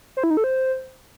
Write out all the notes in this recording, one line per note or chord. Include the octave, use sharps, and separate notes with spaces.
C5
E4
D#4
A4
C5